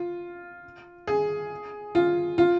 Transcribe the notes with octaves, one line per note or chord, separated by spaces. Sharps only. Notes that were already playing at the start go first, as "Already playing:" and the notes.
Already playing: F4
G#4
F4
F4